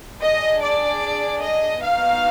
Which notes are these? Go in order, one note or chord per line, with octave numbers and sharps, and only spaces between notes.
D4 G#4 D#5
D5
D#5
B3 D#4 F#4 F5